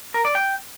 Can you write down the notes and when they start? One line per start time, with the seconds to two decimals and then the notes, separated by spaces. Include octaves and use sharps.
0.14 A#4
0.25 D5
0.35 G5